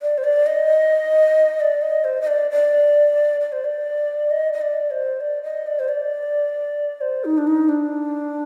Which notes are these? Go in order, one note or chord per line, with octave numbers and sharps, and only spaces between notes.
D5
C5
D5
D#5
D5
D#5
C5
D#5
D5
D5
D5
C5
D5
D#5
D#5
D5
C5
D5
D#5
D5
C5
D5
C5
D#4
D4
D#4
D4